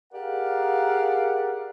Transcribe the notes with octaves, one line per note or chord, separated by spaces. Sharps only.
G4 G#4 A#4 D5 F5 F#5